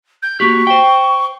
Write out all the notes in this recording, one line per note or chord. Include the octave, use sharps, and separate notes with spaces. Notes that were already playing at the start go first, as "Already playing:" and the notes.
G6
A#3 F#4 G4 C#6
C5 G5